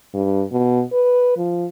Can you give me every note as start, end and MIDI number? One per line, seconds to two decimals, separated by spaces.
0.14 0.44 43
0.52 0.83 47
0.92 1.35 71
1.37 1.66 53